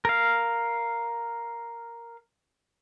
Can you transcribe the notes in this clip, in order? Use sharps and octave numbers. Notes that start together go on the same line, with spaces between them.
A#4 F5